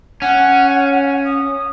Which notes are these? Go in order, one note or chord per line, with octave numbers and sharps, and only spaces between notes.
C#4 F#5
D#6